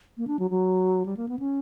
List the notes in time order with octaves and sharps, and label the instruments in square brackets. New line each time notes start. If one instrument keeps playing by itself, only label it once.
[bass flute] A#3
D4
F#3
F#3
G3
A#3
B3
C#4